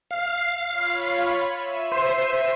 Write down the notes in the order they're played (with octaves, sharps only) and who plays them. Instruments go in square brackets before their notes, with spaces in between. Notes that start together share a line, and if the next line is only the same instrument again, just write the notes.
[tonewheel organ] F5
[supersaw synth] F4 C#5 B5
E5 E6 D#7
[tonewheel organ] C5